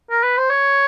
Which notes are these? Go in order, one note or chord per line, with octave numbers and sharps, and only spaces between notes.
A#4
B4
C5
C#5